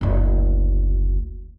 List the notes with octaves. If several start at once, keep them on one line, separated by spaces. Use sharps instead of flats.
F#1 D2